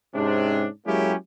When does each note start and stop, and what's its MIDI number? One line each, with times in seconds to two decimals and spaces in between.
0.15 0.67 44
0.15 0.67 48
0.15 0.67 61
0.15 0.67 62
0.87 1.14 54
0.87 1.14 56
0.87 1.14 58
0.87 1.14 61
0.87 1.14 64
0.87 1.14 67